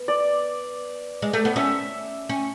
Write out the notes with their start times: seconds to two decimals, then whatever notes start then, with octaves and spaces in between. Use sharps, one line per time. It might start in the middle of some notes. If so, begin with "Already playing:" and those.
Already playing: B3
0.08 D5
1.22 G#3
1.33 A3
1.45 B3
1.56 C#4 E5
2.29 C#4